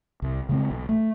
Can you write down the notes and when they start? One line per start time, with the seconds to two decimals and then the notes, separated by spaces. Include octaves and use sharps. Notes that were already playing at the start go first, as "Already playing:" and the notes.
0.22 C2
0.49 C#3 G#3 C4
0.70 B1
0.89 A3